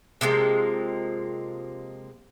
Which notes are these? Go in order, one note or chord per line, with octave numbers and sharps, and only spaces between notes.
C3 F3 G#3 A#3